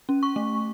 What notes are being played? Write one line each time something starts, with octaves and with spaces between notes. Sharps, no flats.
C#4
C#6
A3